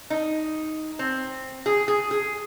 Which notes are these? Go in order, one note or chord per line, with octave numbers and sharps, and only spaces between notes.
D#4
C4
G#4
G#4
G#4